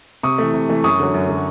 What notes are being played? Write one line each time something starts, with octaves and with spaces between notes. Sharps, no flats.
C3 C#6 D#6
E3 A3
C3
E3 A3
F#2 C#6 D#6
D3 F#3
F#2
D3 F#3